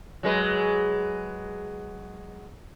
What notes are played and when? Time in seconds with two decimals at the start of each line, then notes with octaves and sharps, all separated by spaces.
0.23 F#3 G#3 B4